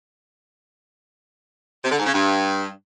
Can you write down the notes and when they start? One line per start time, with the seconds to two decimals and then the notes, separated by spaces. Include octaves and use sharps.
1.83 C3
1.91 D3
1.98 G#2
2.06 C#3
2.13 G2